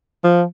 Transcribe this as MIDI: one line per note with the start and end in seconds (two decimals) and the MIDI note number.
0.24 0.44 53